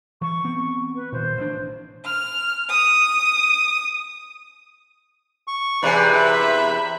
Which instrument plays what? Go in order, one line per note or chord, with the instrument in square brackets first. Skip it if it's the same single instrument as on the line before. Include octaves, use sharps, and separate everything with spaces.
[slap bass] E3 [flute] C#6
[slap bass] B3 C4
[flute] B4
[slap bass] A#2 D#3 [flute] C5
[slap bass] A1 D4
[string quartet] F6
D#6
[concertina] C#6
[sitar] E2 C3 [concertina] B4 [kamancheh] D5 G#5
[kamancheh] E5 B5